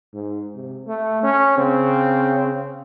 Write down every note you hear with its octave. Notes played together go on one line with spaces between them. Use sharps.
G#2
C3
A3
C#4
C#3 C4